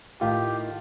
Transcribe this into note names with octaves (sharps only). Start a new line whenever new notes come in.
A2 D#3 F4 G4